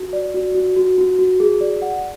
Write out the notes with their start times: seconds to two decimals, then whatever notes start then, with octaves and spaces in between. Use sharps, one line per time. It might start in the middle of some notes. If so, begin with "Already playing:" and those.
Already playing: F#4
0.13 D5
0.34 F#4
0.54 F#4
0.76 F#4
0.98 F#4
1.19 F#4
1.40 G#4
1.61 D5
1.82 F#5